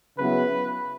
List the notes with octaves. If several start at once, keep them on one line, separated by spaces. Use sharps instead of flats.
C#3 F#3 B3 E4 B4